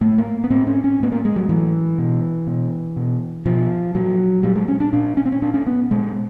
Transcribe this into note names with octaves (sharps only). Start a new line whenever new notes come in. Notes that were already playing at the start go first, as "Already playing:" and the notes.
A2 A3
A#3
B3
A2 C4
C#4
C#4
A2 B3
A#3
G#3
F#3
A2 E3
B2
B2
B2
B2 F3
A#2 F#3
A#2 G3
G#3
C#4
D4
A#2 D4
C#4
C4
C#4
A#2 D4
C#4
B3
A#2 G#3